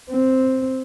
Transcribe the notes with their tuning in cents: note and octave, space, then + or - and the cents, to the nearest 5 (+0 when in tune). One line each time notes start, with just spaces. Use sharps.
C4 +0